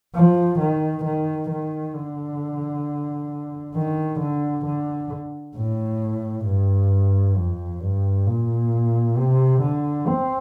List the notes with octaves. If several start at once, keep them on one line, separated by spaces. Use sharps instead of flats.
F3
D#3
D#3
D#3
D3
D#3
D3
D3
A2
G2
F2
G2
A#2
C3
D3
C4